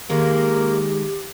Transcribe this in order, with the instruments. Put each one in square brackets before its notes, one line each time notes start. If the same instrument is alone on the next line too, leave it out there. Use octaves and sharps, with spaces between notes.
[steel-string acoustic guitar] D#3 G#3 A#4 [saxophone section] A#3 [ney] G4